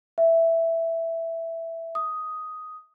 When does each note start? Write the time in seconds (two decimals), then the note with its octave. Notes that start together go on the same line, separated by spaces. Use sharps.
0.18 E5
1.95 D#6